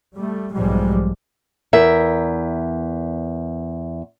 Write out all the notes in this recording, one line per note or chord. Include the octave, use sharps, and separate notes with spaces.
G3 A3
B1 G#2 F3 G3 G#3
E2 A#4 E5